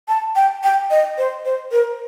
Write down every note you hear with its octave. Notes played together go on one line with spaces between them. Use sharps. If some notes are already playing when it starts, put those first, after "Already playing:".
A5
G5
G5
D#5
C5
C5
A#4